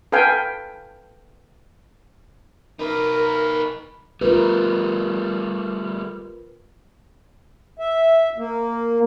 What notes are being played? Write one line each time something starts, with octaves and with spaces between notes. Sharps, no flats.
A4 B4 F5 G5 G#5
D#4 A#4 B4
G3 A3 F4 A#4 B4
E5
A#3